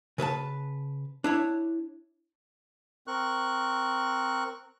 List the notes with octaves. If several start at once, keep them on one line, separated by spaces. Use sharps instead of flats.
C#3 B4 E5 A5
D4 E4 C#5
C4 A#4 C#6 F#6